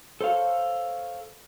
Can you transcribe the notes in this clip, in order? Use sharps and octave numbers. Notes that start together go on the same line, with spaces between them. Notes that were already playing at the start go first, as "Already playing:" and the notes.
A4 C5 C#5 F5